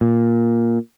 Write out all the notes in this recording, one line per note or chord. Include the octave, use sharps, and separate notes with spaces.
A#2